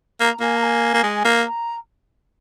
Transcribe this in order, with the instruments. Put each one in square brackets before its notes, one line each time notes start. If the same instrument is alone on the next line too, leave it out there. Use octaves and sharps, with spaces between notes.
[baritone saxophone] A#3 [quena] A#5
[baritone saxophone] A#3 [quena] G#5
[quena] A#5
G#5
[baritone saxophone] A#3
G#3
A#3
[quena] A#5